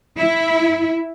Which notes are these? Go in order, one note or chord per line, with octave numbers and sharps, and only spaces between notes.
E4